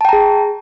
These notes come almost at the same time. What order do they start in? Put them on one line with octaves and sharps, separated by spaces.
A5 G5 A#5 G#4